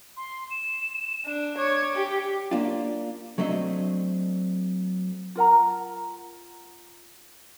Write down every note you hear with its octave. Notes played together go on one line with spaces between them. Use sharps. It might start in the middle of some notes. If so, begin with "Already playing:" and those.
C6
E7
D4
C#5 D6
G4
A#3 D4 F4
F#3 A3 C4 D4 D#5
F4 A#4 F#5 A#5